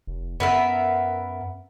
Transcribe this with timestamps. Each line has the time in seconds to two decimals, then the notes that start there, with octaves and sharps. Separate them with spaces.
0.07 F1
0.40 F#2 B3 A#4 E5